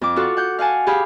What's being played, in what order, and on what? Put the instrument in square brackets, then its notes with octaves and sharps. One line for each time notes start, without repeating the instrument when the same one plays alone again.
[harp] F2 D6
F4 F#4 A4 F#5
F#5 G6
F5 F#5 G#5 A5
G4 G#4 F5 B5